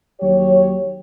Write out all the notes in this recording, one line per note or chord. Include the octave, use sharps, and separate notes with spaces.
D#2 F#3 G4 C#5